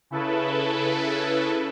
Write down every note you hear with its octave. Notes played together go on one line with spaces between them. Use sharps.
C#3 E4 A4 B4